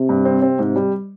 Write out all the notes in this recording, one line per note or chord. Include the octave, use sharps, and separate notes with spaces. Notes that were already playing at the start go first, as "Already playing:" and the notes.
Already playing: C3
G2
C4
C4
G#2
G3